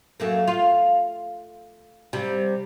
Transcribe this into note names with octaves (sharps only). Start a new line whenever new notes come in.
F#2 A3 A#3
F4
C3 G3